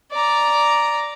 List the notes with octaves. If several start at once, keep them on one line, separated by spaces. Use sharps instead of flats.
D5 A#5